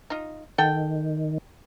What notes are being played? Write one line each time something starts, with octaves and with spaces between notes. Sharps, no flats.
D#4 F4
D#3 A4 F#5 G5